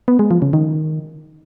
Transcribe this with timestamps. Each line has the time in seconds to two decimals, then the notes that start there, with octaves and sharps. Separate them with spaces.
0.08 B3
0.19 G#3
0.31 F3
0.42 C#3
0.53 D#3